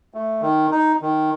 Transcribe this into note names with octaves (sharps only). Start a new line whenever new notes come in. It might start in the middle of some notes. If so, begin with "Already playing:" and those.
A3
D#3
D#4
D#3